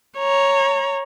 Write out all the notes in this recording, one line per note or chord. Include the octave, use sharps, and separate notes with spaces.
C#5 A#5